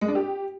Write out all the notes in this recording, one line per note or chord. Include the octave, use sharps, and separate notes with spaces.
G#3
D4
G4